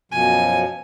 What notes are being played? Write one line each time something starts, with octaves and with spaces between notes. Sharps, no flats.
F#2 B2 F3 G#5